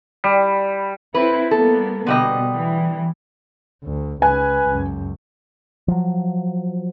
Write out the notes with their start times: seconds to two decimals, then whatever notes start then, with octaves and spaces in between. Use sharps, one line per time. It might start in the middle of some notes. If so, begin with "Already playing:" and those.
0.24 G3
1.14 C4 E4 B4
1.51 G3 A#3 B3 A4
2.06 B2 D3 G3 D#5
2.55 E3
3.84 D2
4.22 C#2 B4 G#5
4.69 C#2 F#2
5.88 F3 F#3